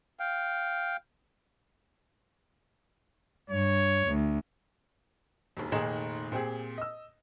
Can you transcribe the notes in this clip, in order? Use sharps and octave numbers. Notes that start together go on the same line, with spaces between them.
F5 G5
G2 C#5
D2
E1 D#2
F1 A#2 D#3 D#4 G#4 E7
A#2 C4 G4 G#4
D#5 E6